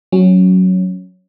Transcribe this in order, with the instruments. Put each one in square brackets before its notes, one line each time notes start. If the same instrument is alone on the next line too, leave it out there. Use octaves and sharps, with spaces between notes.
[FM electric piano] F#3 C#4